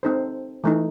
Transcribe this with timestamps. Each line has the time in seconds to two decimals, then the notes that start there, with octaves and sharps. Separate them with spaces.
0.03 C4 D#4 A4 C5
0.64 E3 A3 D#4